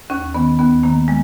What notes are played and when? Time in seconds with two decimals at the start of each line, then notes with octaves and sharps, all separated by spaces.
0.10 D#2 C#4
0.35 D#3 B3
0.59 D#2 B3
0.83 D#3 A#3
1.08 G#3